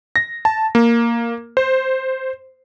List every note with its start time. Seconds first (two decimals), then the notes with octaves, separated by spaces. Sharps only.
0.16 A#6
0.45 A5
0.75 A#3
1.57 C5